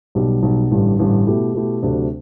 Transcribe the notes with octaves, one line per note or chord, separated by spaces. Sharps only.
B1 B2 G3
B1 B2 G3
A1 G2 D3 G3
A1 G2 D3 G3
B2 A3 E4 G4
B2 A3 E4 G4
D2 C3 F#3 A3 D4